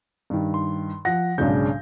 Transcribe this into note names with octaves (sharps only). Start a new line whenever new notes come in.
G2 D#3
C6
F3 F#5 A#6
B1 G#2 C#3 D4 G6